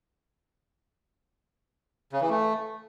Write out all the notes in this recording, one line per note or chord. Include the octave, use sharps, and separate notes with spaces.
C#3
E3
A3